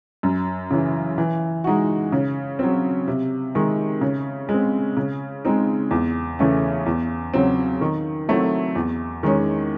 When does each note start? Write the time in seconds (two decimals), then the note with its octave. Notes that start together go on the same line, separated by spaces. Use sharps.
0.23 F#2
0.71 C#3 E3
1.18 E3
1.64 G#3 D#4 F#4
2.12 C#3
2.59 F#3 C4
3.08 C3
3.55 D#3 G#3
4.01 C#3
4.49 G#3
4.54 C4
4.97 C#3
5.45 G#3 C4 D#4
5.91 E2
6.39 C#3 E3 A3 C#4
6.86 E2
7.34 C#3 F#3 C4
7.81 D#3
8.28 F#3 A3 C4 E4
8.75 E2
9.23 D#3 G#3 C#4